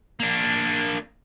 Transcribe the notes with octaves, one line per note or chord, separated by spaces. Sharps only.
A#3 D4